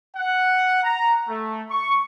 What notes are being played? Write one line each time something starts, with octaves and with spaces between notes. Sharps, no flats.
F#5
A#5
A3
C#6